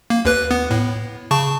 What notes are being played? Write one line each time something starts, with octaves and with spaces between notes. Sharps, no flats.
A#3
D#2 B4 F#6
B3
A2
C#3 A5 C#6